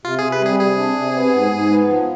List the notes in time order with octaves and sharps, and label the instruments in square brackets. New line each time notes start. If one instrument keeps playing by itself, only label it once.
[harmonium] C3 [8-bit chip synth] F4
[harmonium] C3 [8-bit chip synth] G#4
[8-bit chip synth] B4
[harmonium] G3 [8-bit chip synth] G#4
[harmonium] C3 [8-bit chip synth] G#4
[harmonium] D4
C3
B3
G#2
G#2
B3
F3